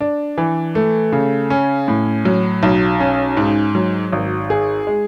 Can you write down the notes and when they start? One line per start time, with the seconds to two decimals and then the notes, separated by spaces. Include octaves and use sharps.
0.01 D4
0.38 E3
0.75 A3
1.12 C#3
1.50 C#4
1.88 A2
2.25 F#3
2.63 B1
3.00 C#4
3.37 G#2
3.75 F#3
4.12 G#1
4.50 G#4
4.87 G#3